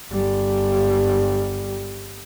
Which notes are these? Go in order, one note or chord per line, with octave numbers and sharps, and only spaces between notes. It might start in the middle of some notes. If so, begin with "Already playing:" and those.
G1 G3